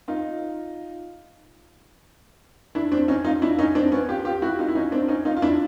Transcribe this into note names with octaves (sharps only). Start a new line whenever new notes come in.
D#4 F4
D4 E4
C4 D4
C#4 D#4
D#4 F4
D4 E4
C#4 D#4
C4 D4
B3 C#4
F4 G4
F4 G4
E4 F#4
D#4 F4
E4
C#4 D#4
C4 D4
C#4 D#4
D#4 F4
F4
D4 E4